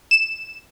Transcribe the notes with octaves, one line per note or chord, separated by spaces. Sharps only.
E7